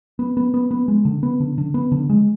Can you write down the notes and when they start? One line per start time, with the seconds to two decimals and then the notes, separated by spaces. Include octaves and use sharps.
0.19 B3
0.37 B3
0.54 B3
0.71 B3
0.88 G#3
1.05 D3
1.23 B3
1.40 D3
1.58 D3
1.74 B3
1.92 D3
2.10 G#3